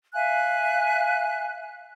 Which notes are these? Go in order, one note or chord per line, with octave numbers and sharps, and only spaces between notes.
E5 F5 G#5 F#6